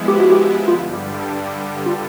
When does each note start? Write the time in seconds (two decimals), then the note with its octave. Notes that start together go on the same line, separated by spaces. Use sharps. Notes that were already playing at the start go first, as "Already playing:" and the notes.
Already playing: F3 G#3 B3 E4
0.08 G4
0.20 F#4
0.31 G4
0.68 G2 D3 G3 F4
1.86 F4